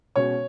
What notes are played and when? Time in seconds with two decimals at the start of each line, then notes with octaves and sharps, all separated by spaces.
0.16 B2 G#3 C#4 F#4 C#5